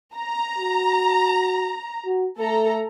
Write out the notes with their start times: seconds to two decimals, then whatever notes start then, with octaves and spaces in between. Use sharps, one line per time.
0.15 A#5
0.58 F#4
2.06 F#4
2.38 A3 A4 A#5